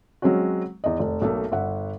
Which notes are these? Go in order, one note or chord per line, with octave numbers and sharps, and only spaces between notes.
F#3 G#3 C4 C#4 F#4
E2 D#5
F1
B1 A3 A#3
G1 E5 F#5